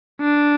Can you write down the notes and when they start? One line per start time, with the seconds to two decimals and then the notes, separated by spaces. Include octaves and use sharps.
0.21 D4